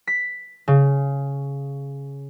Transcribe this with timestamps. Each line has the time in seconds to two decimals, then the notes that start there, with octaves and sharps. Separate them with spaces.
0.07 B6
0.68 C#3